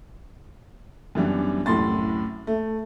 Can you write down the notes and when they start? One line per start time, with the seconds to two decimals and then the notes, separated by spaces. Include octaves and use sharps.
1.15 F#2 E3 G3 B3 D4
1.66 C2 F#2 A2 C6 A6
2.47 A3